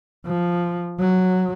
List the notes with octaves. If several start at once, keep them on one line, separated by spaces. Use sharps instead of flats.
F3
F#3